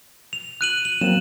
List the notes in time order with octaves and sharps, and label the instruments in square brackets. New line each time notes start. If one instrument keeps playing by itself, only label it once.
[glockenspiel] F7
F#6 D#7 F#7
F#7
[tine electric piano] F#3 A#3 C4 [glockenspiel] E7